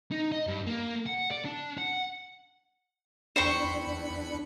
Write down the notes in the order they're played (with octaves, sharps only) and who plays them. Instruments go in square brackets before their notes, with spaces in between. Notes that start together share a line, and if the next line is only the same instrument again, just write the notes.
[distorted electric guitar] D#4
D#5
G2
A#3
F#5
D5
D4
F#5
[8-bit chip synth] E2 B5 C#7 [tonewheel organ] D4 [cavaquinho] C5 G5 C#6